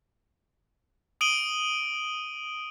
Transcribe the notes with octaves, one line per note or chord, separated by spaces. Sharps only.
D#6 D7 D#7 F#7 G7